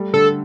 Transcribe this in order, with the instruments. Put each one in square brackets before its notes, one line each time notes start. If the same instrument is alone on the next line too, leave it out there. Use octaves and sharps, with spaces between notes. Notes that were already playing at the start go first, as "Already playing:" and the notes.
Already playing: [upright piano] G3 A3
[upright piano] D3 [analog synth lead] A4